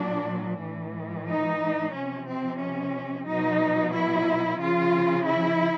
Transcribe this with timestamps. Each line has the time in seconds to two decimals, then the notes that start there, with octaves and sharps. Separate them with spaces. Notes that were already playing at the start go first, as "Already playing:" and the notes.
Already playing: A#2 F#3 D4
0.61 A2 E3
1.29 D#4
1.94 C3 F3 C#4
2.28 C4
2.60 C#4
3.27 B2 F#3 D#4
3.94 E4
4.60 C#3 F3 F4
5.26 E4